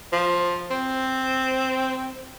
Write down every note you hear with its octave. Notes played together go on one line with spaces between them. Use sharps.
F3
C4